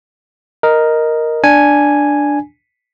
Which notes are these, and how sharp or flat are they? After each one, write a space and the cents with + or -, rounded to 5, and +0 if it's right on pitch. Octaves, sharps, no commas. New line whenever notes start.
A#4 +0 D#5 +0
D4 +0 G#5 +0